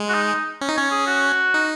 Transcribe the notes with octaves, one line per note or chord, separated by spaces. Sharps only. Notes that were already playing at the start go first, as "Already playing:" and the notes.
Already playing: G#3
F#4
D#4
C#4
D#4
C#4 C#5
G#4
F#4
D#4